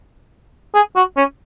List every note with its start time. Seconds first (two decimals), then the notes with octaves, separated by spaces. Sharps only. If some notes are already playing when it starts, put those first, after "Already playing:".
0.75 G#4
0.96 F#4
1.17 C#4